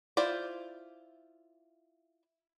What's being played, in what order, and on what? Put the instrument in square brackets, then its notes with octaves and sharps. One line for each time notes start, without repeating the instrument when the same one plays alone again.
[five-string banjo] E4 F4 C5 D5